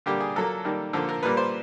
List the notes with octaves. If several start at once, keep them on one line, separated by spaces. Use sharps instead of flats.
D3 G3 A#3 G4
G#4
A#2 F#3 A#3 A4
D#3 G3 A#3
D3 F3 A#3 A4
A#4
A#2 G3 A#3 B4
C5